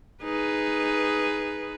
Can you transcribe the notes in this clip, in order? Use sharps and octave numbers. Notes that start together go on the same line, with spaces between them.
D#4 G#4 B4